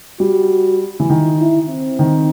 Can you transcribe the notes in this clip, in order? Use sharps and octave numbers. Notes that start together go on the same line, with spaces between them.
G3 F#4
E3
D#3 E4
E4
C4
D#3